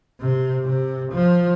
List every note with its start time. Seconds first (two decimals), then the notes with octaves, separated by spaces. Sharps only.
0.20 C3
0.65 C3
1.13 F3